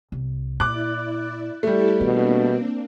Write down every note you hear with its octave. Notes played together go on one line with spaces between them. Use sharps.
C2
A#2 E4 D5 D6 F#6
G3 A3 E4 G4 A4
B2 D#3 A#3 C4 D4